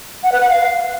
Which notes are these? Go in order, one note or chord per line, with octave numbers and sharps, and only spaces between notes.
F#5
B4
F#5
F5